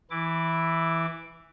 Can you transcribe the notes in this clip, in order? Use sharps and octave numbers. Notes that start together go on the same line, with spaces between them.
E3 E4 D6